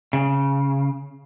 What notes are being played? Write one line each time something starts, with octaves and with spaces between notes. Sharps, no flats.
C#3